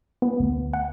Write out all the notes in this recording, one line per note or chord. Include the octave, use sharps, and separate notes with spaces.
B3
D2
F#5